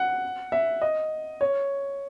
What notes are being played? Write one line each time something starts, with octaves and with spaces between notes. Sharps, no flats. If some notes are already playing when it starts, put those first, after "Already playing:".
Already playing: F#5
E5
D#5
C#5